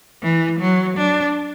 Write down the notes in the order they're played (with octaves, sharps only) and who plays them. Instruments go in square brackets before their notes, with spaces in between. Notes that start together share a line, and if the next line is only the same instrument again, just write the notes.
[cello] E3
F#3
D4